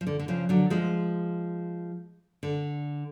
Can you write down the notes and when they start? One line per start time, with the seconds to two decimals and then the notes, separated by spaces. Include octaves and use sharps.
0.01 F3
0.07 D3
0.19 D3
0.28 C#3 F3
0.49 D3 F#3
0.70 F3 G#3
2.43 D3